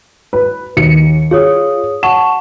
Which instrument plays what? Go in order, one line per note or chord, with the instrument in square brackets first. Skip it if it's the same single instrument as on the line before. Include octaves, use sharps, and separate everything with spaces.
[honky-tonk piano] B4
D#2 C#7
[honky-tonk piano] F4 [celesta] G#4 C#5 D#6
[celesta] F#5 A5 C#6 [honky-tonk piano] E7